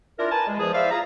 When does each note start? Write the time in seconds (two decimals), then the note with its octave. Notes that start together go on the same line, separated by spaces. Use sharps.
0.18 D4 E4 F4 A#4
0.31 A#4 B4 G#5 A5
0.47 G#3
0.59 E2 F3 G#4
0.73 E4 C5 D5 E5 F5
0.91 F4 G#4 A#5